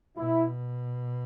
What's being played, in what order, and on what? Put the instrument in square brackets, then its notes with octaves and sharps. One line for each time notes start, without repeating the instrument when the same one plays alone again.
[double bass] B2 [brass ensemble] E4